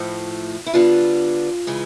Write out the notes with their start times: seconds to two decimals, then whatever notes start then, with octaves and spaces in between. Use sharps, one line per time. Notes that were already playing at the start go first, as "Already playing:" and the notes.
Already playing: A2 F3 A3
0.66 E4
0.74 D3 G3 B3 D4 F4
1.67 C#3 E3 G#3